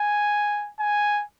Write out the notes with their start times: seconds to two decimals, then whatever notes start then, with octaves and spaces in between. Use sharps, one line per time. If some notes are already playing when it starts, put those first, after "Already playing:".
Already playing: G#5
0.80 G#5